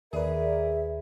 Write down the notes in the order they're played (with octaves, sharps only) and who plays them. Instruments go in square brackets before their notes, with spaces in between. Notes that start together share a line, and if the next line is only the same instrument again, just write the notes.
[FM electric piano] D#2 B4 [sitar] G#4 [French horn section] A#4 D5 [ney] E5